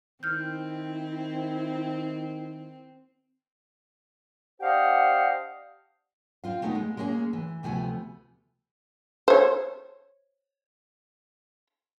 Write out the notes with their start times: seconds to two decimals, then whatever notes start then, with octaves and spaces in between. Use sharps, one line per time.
0.23 D#3 C4 E4 F6 G6
4.60 D4 G4 C5 D#5 F5 F#5
6.44 C4 F4 F5
6.62 G#3 A3 B3 D#4
6.75 G#3
6.97 G#3 A#3 C#4 E4 G#4
7.33 E3
7.63 D2 C3 F3 A3 B3 G#5
9.28 C5 C#5